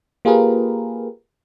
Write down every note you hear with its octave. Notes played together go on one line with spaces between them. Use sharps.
A#3 F4 G4 G#4 A#4 B4